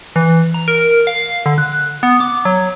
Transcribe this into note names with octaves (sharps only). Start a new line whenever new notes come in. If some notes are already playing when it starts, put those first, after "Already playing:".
E3
A#5
A#4
F5
D3
F#6
B3
D6
F#3